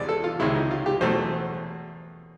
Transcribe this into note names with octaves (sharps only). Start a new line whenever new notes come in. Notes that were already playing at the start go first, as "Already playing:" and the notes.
Already playing: E2 C3 E3 G#3 B3 D5
A4
F4
C#2 C3 D#3 G#3 E4
D#4
F4
G4
E2 B2 F#3 A3 C5